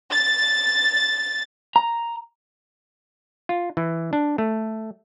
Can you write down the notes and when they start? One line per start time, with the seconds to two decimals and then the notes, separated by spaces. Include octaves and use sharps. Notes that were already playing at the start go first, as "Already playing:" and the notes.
0.10 A6
1.76 A#5
3.49 F4
3.77 E3
4.13 D4
4.38 A3